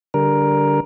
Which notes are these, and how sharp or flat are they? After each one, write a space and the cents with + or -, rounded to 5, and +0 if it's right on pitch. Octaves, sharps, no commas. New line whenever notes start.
D3 -10 G3 -5 A#4 +10